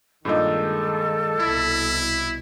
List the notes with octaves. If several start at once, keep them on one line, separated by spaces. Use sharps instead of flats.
G2 A#2 D#3 G#3 D#4 A4
C2 B2 E4